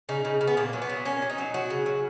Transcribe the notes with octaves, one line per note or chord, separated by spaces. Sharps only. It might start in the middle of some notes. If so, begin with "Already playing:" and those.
C#3 D#4
C#3
C#3
B3
A#2 A#3
F#3
B3
F#3
A#2 C#4
F#3
D#4
F#3
F#3 F#4
C#3
F#3